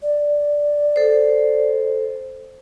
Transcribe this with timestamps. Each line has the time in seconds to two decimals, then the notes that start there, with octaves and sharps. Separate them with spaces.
0.02 D5
0.96 A4 C5